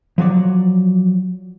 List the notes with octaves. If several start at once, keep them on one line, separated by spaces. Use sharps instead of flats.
F3 F#3 C#5 D5